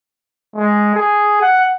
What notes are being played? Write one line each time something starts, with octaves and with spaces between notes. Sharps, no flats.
G#3
G#4
F#5